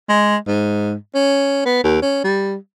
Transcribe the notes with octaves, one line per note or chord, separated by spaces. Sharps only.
G#3
G#2
C#4
B3
D#2
C#4
G3